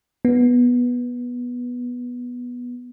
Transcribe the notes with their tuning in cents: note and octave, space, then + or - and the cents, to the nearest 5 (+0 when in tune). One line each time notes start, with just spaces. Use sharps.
B3 -10